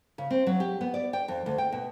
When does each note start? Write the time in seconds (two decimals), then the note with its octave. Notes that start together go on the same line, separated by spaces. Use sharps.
0.18 C#3
0.30 C4
0.47 F#3
0.60 G4
0.81 B3
0.94 D5
1.13 G5
1.28 F2
1.46 D2
1.58 G5
1.72 B2